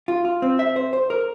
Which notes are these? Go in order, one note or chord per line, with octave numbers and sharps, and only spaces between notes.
F4
F4
C4
E5
C5
C5
A#4